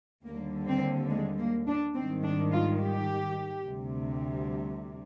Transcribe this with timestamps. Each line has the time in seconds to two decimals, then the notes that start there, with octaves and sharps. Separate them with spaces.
0.25 D#2 D3 G3 A#3
0.68 C4
1.10 G#3
1.38 A#3
1.67 D4
1.95 G#2 D#3 G3 C4
2.24 D4
2.51 F4
2.80 G4
3.66 D2 C3 G3